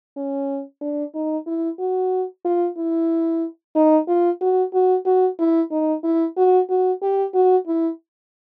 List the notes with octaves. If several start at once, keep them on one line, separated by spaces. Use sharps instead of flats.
C#4
D4
D#4
E4
F#4
F4
E4
D#4
F4
F#4
F#4
F#4
E4
D#4
E4
F#4
F#4
G4
F#4
E4